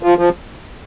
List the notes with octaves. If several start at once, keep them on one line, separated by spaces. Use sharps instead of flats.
F3
F3